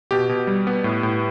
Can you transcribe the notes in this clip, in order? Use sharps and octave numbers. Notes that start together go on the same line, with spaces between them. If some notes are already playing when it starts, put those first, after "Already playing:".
B2 G4
B2
G3
B3
A2
A2